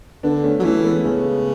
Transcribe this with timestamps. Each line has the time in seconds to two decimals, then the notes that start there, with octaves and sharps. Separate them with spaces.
0.23 D3 B3 D4
0.43 A3 C#4
0.60 F#3
0.64 E3 A3 C#4
0.84 G#3 B3
1.04 C#3 A3 C#4